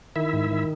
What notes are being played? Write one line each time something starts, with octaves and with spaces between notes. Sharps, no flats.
D#3 E4 E5
G#2
D#3